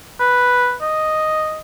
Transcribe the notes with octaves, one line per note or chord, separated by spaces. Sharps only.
B4
D#5